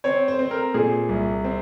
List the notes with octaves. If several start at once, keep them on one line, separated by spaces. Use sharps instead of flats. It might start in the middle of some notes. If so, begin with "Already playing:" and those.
C4 C#5
C5
C4
A#4
A#2 G#4
C2
C4